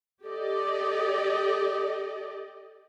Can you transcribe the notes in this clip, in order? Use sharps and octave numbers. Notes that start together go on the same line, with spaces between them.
G4 A4 D5 D#5